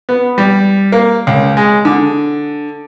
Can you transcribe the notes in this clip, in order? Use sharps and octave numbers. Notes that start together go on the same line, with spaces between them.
B3
G3
A#3
C#2
G#3
D3